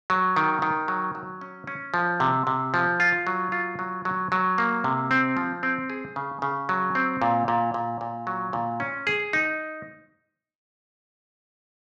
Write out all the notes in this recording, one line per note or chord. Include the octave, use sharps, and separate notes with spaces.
F#3
D#3
D#3
F#3
F#3
C#4
C#4
F3
C3
C3
F3
F4
F#3
F4
F#3
F#3
F#3
A#3
C3
C4
F3
C4
G#4
C#3
C#3
F#3
C4
A#2
A#2
A#2
A#2
F#3
A#2
C#4
G#4
D#4